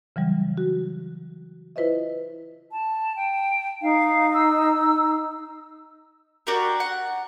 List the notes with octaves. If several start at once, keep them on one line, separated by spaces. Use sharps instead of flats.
C#3 E3 F#3 G3
F#4
E4 F4 B4 C5 D#5 E5
A5
G5
D#4 F5
E6
D4 F#4 G4 A#4
F#5